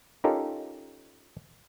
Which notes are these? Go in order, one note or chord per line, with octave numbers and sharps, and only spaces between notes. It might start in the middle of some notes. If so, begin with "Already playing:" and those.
C#4 D#4 F4 G4 A4 A#4